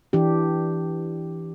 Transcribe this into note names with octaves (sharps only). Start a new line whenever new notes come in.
E3 D4 G4